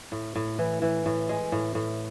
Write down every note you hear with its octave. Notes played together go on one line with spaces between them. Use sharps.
A2
A2
E3
E3
A2
G#3
A2
A2